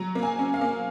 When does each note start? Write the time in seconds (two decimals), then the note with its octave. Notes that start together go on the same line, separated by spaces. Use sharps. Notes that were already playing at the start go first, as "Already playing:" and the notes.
Already playing: F#3 A#5
0.15 A#3
0.23 G#5
0.39 C#4
0.54 F5
0.61 A#3